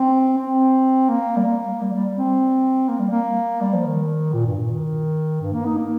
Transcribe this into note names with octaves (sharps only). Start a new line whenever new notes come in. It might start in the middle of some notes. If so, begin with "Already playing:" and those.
Already playing: C4
C4
A#3
G3
A#3
G3
G3
C4
A#3
G3
A#3
G3
F3
D#3
A#2
G2
A#2
D#3
G2
A#3
D#4
A#3